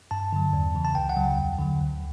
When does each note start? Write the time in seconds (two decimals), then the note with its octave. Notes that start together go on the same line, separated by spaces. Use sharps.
0.11 G2 A5
0.33 D3 F#3
0.53 E2
0.75 C#3 E3
0.85 A5
0.95 C#2 G5
1.09 F#5
1.16 C#3 F#3
1.38 E2
1.59 D3 F#3
1.80 D2